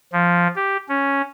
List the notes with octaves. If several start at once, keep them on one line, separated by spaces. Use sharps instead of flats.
F3
G4
C#4